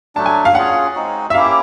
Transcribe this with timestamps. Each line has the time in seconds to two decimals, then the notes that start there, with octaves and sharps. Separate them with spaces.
0.15 F#3 A3 D4 A5
0.26 G#5
0.45 F5
0.55 C#4 F4 G#4 F#5
0.95 G#3 C4 D#4 F#4
1.30 E5
1.34 A#3 C#4 E4 G4 F5